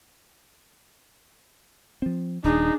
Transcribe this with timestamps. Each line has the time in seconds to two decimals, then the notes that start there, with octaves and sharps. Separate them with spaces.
2.02 F3 C4
2.44 D#1 D4 D#4 G#4